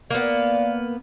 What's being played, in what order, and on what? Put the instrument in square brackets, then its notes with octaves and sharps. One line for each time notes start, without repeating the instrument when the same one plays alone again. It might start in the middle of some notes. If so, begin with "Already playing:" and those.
[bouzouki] A#3 B3 [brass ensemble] D5 F5